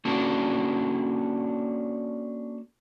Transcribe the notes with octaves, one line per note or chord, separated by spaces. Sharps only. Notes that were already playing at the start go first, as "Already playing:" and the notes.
A#3 C#4 D4 F#4 A4